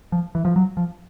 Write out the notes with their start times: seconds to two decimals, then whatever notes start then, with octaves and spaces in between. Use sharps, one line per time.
0.12 F3
0.35 E3
0.45 F3
0.56 F#3
0.77 F3